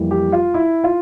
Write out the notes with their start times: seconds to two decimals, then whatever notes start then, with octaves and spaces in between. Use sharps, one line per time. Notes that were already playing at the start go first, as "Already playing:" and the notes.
Already playing: F2 E3 G3 A#3
0.11 G4
0.32 F4
0.54 E4
0.84 F4